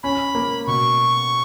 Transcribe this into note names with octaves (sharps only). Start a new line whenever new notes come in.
C#4 B5
A#3
B2 C#6